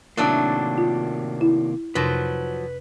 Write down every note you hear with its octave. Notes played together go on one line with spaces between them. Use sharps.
A2 C3 D#3 F#3 A#3 D4
F4
E4
F2 C3 F3 F#3 B4 A#6